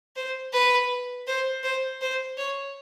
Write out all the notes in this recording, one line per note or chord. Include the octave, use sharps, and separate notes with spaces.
C5
B4
C5
C5
C5
C#5